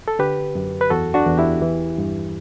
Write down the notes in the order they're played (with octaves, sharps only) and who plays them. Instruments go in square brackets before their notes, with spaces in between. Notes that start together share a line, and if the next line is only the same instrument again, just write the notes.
[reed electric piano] A4
D3 G4 B4
F#2
B4
E2 F#4 A4
D4 F#4
E2
E4 G4
E3
G2